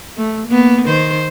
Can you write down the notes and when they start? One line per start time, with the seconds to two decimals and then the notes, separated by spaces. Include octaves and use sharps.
0.18 A3
0.47 A#3 B3
0.85 D#3 C5